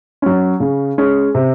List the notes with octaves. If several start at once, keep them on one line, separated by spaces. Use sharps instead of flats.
F#3 C#4
C#3
G#3 C#4
C3